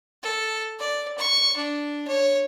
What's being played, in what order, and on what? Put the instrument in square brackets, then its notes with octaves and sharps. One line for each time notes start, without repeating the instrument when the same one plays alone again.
[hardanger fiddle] A4
D5
C#6
D4
C#5